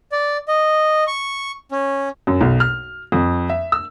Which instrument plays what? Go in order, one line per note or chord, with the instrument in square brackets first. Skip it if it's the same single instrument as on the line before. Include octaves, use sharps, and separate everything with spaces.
[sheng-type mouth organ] D5
D#5
C#6
C#4
[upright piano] F#2
B1
F6
F2
E5
E6